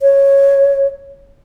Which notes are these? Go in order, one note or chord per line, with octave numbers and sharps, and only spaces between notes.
C#5